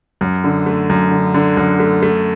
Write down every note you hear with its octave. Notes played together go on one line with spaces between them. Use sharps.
F#2
D3
A3
F#2
D3
D3
F#2
A3
A3